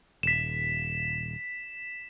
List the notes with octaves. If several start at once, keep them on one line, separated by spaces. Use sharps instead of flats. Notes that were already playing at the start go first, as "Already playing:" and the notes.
D#1 B6 E7